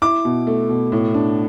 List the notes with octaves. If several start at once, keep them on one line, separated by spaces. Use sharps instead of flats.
E4 D6
B2
A3
B2
A2
D4